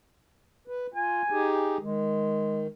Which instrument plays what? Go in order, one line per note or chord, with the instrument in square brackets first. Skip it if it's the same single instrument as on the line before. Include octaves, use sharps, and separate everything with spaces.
[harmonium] B4
[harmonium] F4 [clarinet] G#5
[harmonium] D#4 G4 G#4
[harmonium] D#3 [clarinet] G#3